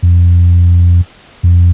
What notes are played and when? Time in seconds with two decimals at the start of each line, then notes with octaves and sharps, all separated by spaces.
0.03 F2
1.43 F2